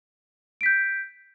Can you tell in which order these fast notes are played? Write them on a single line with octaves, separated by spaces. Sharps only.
D7 B6 G6